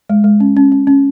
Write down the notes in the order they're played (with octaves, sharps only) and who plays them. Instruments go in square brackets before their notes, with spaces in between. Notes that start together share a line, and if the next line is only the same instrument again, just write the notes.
[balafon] G#3
G#3
C#4
C#4
C#4
C#4